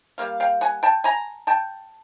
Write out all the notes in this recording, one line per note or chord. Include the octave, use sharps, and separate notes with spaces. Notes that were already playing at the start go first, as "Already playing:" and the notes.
G3 A#3 F5
F5 G5
F#5 G#5
G5 A5
G#5 A#5
G5 A5